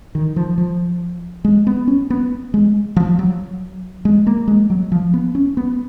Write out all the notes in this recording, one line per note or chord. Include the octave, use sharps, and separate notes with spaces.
D#3
F3
F3
G#3
B3
C#4
B3
G#3
F3
F#3
G#3
A#3
G#3
F#3
F3
B3
C#4
B3